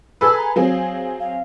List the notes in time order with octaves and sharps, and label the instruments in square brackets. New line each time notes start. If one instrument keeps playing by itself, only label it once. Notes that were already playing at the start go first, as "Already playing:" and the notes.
[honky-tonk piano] G#4 A4 B4 [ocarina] E6
[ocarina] A#5
[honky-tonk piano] F#3 C4 G#4 [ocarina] F5
[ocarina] F5